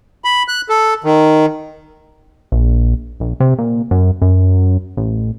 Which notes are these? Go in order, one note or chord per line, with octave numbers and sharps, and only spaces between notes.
B5
F#6
A4
D#3
A#1
A#1
C3
A#2
F#2
F#2
A1